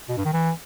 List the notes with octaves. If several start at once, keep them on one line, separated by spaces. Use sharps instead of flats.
B2
G2
D#3
E3